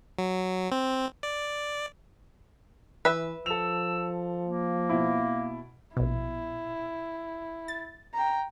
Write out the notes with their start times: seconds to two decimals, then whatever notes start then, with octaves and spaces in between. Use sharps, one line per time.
0.19 F#3
0.72 C4
1.23 D5
3.05 E3 B4 E5
3.46 F3 A4 E6 F7
4.45 A#3
4.89 B2 E4
5.97 A#1 B2 E4
7.68 A6
8.14 G5 A#5